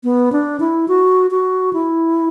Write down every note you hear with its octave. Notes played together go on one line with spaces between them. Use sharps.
B3
D4
E4
F#4
F#4
E4